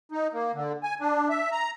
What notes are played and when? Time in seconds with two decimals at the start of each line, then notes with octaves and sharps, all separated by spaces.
0.12 D#4
0.33 A#3
0.54 D3
0.83 G#5
1.01 D4
1.29 E5
1.52 A#5